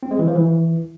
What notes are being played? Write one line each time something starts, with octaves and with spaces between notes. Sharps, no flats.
C4
G#3
E3
F3
E3